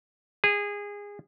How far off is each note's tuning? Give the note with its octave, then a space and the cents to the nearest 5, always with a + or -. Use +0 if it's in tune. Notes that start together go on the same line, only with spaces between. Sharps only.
G#4 -20